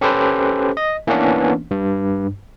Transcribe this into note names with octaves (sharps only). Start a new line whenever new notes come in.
C#4 G4 A4 B4 C5
D#5
E3 A#3 B3 C#4 D4
G2